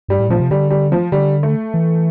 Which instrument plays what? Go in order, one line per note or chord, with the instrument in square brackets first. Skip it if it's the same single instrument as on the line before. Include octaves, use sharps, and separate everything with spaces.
[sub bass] G2 [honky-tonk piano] G3
[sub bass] A2
[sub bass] A#2 [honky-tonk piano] F3
[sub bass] C3
[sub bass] D3 [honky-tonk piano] G3
[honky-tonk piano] G3
F3
[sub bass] D3 [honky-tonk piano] G3
[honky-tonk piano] A3
[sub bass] E3